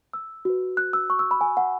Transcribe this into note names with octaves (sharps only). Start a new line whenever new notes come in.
E6
F#4 B4
F#6
E6
C#6
E6
B5
G#5
F#5